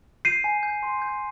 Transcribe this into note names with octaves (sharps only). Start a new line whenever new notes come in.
G6 C7 D#7
G#5
G6
C6
G6